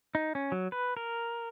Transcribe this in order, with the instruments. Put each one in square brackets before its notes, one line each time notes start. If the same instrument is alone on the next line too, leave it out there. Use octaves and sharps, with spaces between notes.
[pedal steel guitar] D#4
C#4
F#3
B4
A#4